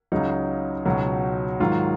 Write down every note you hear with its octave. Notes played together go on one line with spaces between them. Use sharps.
C#2 C#3 F#3 D#4
C#2 B2 F#3
G#2 D#3 F#3 F4